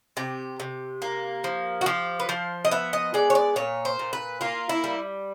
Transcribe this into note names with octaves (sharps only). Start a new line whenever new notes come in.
C3 G4
C3
A#3
F3
F#4
F3 G4
B4
F3 C5
D#5
B3 E5
D#5
G#3 D5
C#5
D5
A#2 C#5
C5
A#2
B4
A#3 F4
E4
G3